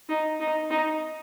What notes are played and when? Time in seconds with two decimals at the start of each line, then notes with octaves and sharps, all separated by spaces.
0.09 D#4
0.40 D#4
0.70 D#4